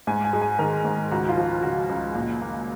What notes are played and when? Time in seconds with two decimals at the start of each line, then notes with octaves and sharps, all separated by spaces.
0.07 G#2 G#5
0.24 G#5
0.33 G#3
0.42 G#5
0.59 D#3 A#4
0.85 G#2
1.12 C#2 F#4
1.29 F4
1.37 F3
1.63 C#3 F#4
1.89 C#2
2.15 A#2
2.42 A#3